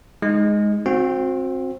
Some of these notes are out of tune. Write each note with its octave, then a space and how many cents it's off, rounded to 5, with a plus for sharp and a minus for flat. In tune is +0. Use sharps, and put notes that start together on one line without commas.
G#3 +0 D#4 +0
C4 +15 F#4 -35